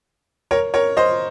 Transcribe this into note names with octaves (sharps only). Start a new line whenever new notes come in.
A#4 C#5
A#4 C#5
C5 D#5